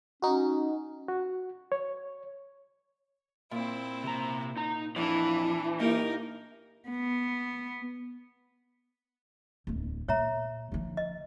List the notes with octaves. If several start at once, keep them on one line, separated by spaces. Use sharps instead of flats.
C#4 D#4 F#4
F#4
C#5
A#2 C4 E4
C3 A#5
D#4 A#5
F2 E3 D4
A#3 D#4 G4 A#4
B3
D1 E2
A#2 C#5 E5 A#5
D3 F3
D#5